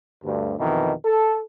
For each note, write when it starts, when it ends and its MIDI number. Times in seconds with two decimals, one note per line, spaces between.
0.25 0.55 38
0.25 0.55 43
0.59 0.93 41
0.59 0.93 47
0.59 0.93 51
0.59 0.93 52
1.05 1.39 69